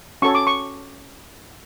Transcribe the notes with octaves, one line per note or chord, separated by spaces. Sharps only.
C#4 F#4 A4 C#5 C#6
D6
C#6